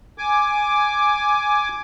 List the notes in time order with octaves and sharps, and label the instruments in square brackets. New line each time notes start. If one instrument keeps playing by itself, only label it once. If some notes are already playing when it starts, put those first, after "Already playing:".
[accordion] G#5 D6